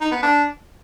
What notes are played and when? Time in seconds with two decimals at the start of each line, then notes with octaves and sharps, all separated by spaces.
0.01 D#4
0.11 B3
0.22 D4